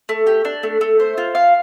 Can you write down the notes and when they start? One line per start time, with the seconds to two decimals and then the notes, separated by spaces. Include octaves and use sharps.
0.09 A3
0.27 G4
0.45 D4
0.63 A3
0.81 A3
1.00 C5
1.18 F4
1.35 F5